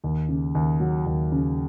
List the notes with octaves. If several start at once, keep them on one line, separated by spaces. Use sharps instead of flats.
D#2
C#3
D#2
F#3
D#2
C#3